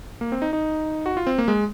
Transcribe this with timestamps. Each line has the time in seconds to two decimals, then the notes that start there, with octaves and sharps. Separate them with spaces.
0.21 A#3
0.32 C4
0.42 D#4
0.53 D#4
1.06 F#4
1.17 F4
1.27 C4
1.38 A#3
1.48 G#3